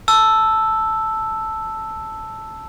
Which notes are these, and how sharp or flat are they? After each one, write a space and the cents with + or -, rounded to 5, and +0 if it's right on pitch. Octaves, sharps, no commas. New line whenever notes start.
A5 +0 E6 +0